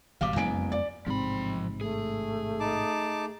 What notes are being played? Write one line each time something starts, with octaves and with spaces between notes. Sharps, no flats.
G#1 B2 G3 F5 D6
F#1 F2 G#3 B3 G#5 D7
D5
A1 G#2 C3 F3 C4 B5
A3 G#4
D#4 A5 D6